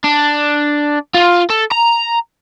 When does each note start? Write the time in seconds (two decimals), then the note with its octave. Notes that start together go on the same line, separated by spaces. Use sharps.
0.04 D4
1.14 F4
1.50 A4
1.72 A#5